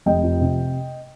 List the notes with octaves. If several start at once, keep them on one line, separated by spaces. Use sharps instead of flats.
F1 D#5 G5
F2
C3